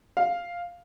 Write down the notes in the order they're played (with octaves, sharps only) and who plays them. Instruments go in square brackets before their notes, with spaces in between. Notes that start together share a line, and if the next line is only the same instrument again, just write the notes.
[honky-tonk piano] F5